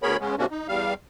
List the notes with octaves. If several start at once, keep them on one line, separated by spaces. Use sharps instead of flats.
D2 B3 G#4 A#4 C#5 B5
C#3 G#3 B3 C#4
G#2 C3 A#3 C#4 D4 F#4
D#4
E2 G3 F5